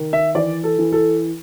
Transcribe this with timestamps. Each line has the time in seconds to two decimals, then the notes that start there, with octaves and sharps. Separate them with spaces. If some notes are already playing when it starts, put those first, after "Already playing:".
Already playing: D#3
0.13 E5
0.35 E3 D5
0.64 A4
0.78 E3
0.92 A4